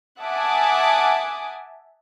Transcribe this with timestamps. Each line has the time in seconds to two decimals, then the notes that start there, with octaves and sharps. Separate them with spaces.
0.21 E5 F#5 G#5 A5 D6 D#6